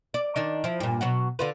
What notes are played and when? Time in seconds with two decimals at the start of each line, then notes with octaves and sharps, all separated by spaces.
0.14 D5
0.36 D#3 D4 D#4
0.64 F3 E4
0.80 G2 A#2
1.01 B2 F#3 F#4
1.39 D3 F4 B4